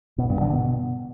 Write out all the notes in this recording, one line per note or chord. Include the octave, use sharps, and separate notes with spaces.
B2
G2
D3
B2